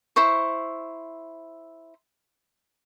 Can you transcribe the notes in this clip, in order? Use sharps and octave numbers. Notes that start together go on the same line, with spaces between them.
E4 C5 C#6